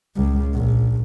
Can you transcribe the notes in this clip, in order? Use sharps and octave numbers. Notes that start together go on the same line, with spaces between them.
C#2
A#1